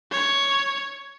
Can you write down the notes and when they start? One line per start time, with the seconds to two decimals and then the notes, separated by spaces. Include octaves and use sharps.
0.11 C#5